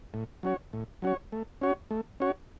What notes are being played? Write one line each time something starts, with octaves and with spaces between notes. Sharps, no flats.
A2
F#3 C#4 F#4 C#5
A2
F#3 C#4 F#4 C#5
A3
C#4 F#4 C#5
A3
C#4 F#4 C#5